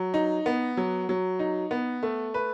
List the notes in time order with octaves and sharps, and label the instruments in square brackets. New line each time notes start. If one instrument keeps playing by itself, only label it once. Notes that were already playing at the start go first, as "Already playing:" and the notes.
Already playing: [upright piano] F#3
D#4
B3
F#3
F#3
D#4
B3
A3
B4